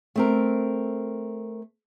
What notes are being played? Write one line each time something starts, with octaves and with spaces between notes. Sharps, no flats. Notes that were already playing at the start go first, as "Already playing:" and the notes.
A3 C4 A#4